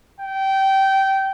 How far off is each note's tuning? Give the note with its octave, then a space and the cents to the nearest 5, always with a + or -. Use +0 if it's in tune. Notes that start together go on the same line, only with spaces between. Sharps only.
G5 -20